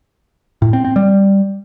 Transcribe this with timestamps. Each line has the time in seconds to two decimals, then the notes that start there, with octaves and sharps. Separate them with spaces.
0.62 A2
0.73 C4
0.85 C4
0.96 G3